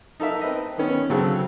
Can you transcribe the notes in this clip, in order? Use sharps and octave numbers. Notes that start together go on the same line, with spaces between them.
D#4 A4 A#4 E5
C4 B4 D#5
D#3 B3 C#4
C#3 F#3 C4 G#4 A4